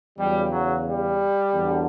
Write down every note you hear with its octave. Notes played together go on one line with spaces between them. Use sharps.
E2 C#3 F#3 G3
F#3
G3
E2 D3 F#3